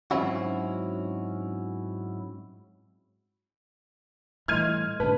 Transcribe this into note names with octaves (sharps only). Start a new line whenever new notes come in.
G#2 F#3 C4 C#4 E4 F#4
A2 E3 G3 D#5 C6 F6 G#6 D#7
G#2 B2 D3 B4 A5